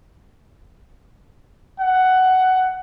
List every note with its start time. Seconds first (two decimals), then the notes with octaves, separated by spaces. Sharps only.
1.80 F#5